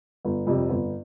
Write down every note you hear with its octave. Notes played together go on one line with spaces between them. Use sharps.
G1
F2 C3 G3
G1